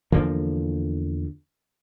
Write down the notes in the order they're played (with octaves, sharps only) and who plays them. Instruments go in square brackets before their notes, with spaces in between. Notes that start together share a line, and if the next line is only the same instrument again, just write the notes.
[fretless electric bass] E2 D3 F3 A#3